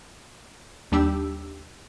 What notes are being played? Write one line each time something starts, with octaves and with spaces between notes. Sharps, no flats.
D#2 G3 D4 G4 E6